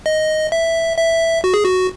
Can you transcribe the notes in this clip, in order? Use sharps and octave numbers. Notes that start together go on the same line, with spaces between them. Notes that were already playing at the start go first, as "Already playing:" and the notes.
D#5
E5
E5
F#4
G#4
F#4